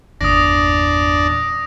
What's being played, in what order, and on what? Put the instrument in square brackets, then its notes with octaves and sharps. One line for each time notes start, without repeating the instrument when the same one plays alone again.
[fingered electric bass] G1 E2 A#2 [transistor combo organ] D4 [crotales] D#6 A#6